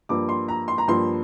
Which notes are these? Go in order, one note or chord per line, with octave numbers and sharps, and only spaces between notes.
G2 F3 A#3 D6
C6
A#5
C6
A#5
G2 F3 A#3 C6